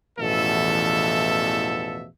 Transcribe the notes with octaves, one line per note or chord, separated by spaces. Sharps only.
A1 E2 B2 F3 A4 E5